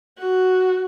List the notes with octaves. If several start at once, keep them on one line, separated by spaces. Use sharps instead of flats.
F#4